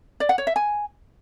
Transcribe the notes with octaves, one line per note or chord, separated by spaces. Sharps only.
D5
F#5
C#5
E5
G#5